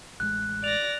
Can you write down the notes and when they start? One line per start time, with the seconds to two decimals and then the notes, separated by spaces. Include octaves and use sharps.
0.20 A1 G#3 F#6
0.64 D5 A#6 F7